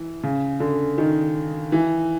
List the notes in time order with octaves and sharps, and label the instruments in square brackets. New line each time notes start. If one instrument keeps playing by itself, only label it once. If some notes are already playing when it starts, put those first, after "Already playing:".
Already playing: [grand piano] E3
C#3
D3
D#3
E3